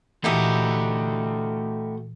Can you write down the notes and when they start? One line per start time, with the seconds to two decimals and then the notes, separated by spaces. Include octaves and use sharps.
0.24 A#2 E3 A3 D#4 E4 F#4 G4